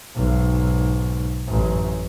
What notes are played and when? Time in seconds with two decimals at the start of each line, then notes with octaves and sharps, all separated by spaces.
0.16 B1 G#2
1.48 A1 F#2